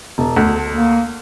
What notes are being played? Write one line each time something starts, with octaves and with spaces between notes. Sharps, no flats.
E1
D2
A#3